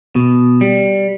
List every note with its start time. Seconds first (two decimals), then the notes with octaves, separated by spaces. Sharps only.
0.16 B2
0.61 G3